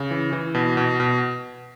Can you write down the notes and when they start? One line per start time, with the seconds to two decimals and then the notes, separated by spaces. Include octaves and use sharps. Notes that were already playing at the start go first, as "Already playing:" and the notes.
Already playing: C#3
0.11 E3
0.33 E3
0.55 B2
0.77 B2
1.00 B2